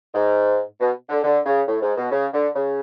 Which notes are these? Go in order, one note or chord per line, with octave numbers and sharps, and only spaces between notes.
G#2
B2
D3
D3
C#3
A2
G#2
B2
C#3
D3
C#3